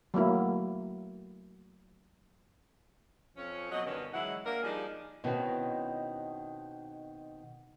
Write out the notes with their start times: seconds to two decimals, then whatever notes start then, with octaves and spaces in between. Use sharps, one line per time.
0.14 F#3 A3 A#3 E4
3.37 F2 F3 C#4
3.72 B2 F#3 D#5
3.86 G2 B2 D3 D#3 C#4
4.14 E3 F#3 G#3 E4 F#5
4.45 A#3 D4 A#4
4.63 F3 G3 D4 D#4 G#4
5.24 B2 D#3 C4 C#4 E4 F#4